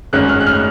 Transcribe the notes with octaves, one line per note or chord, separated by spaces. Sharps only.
G#1 F#2 D#3 G#3 C#4 F#6
F6
F#6
F6